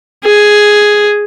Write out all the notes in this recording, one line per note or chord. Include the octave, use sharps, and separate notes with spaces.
G#4